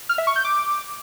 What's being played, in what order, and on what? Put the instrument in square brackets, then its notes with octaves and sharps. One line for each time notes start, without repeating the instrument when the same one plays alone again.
[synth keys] F6
E5
C#6
G6
D6